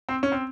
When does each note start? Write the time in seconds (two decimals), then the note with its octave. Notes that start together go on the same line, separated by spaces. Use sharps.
0.09 C4
0.23 C#4
0.32 C4